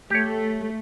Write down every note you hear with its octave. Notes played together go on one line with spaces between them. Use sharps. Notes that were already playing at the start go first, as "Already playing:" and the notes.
A3 G4 C#5